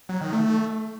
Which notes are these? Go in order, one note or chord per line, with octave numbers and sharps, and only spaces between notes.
F#3
D#3
A3